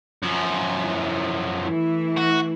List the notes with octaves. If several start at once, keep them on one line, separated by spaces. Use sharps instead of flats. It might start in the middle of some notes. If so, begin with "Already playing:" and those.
F#2 F3
E4
E3 A3 E4
F#4